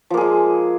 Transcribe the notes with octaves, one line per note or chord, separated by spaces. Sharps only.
F3 G#3 A#3 G#4